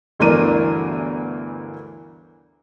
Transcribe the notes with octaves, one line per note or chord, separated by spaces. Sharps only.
G1 D2 E3 D4 A#4 D#7